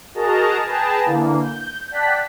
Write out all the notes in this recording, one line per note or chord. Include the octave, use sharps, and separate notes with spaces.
F#4 G#4 A#4 D#5 A5 A#5
G#4 B4 G5 A5 A#5
D3 E3 A#3
G6
D5 F#5 G5 A5 F#6 B6